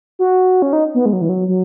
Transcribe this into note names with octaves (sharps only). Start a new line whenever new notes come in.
F#4
C#4
D#4
B3
G#3
F#3
E3
F#3
F#3